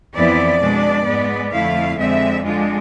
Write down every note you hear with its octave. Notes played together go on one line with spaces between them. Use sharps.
F2 E3 B3 E4 D5
B2 G#3 D4
G#2 G#3 B3
F2 D3 A3 E4 F5
F2 D3 G#3 C4 E5
D3 G#3 D4 F4